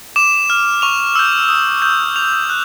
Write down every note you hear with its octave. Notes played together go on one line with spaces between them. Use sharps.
D6 E7
F6
C#6 F7
E6 G6
D#6
G6
D6 F7
F#6